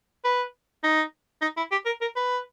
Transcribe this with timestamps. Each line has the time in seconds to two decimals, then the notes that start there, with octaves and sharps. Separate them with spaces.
0.25 B4
0.84 D#4
1.42 D#4
1.57 E4
1.72 G4
1.86 A#4
2.02 A#4
2.16 B4